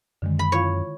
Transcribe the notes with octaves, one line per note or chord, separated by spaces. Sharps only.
F#2 D3 D#3 G#3
B5
E4 F4 C#5 F5